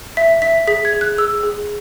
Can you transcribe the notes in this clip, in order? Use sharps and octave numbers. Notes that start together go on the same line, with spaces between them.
E5 B6
E5 B6
G#4 B6
G#6
G#4
F#6
G#4 E6
G#4